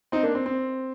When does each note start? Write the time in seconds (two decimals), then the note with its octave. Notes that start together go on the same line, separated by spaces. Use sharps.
0.12 C4 D#4
0.23 A#3 D4
0.35 C4
0.46 C4